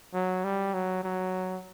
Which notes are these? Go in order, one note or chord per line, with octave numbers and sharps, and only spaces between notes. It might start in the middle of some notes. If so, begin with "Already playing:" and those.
F#3
G3
F#3
F#3